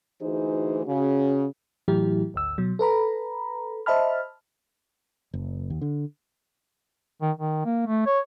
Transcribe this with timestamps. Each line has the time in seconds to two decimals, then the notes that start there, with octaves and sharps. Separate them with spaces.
0.21 D2 E3 D#4 F#4 G#4 C5
0.87 C#3 F#4
1.88 A2 E3 F#3 E4 G4
2.34 G#1 D2 E6
2.58 B2 F#3
2.79 A4 B4 A#5 B5
3.86 C5 D#5 E5 A5 B5 F6
5.33 F#1
5.70 D#2
5.81 D3
7.22 D#3
7.37 D#3
7.65 A#3
7.87 A3
8.06 C#5